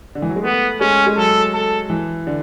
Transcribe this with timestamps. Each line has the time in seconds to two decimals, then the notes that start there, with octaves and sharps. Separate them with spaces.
0.15 D3
0.22 E3
0.29 F#3
0.36 G#3
0.43 A3 B3
0.80 G#3 C#4
1.07 G#3
1.17 F#3 A4
1.54 A4
1.90 E3
2.27 D3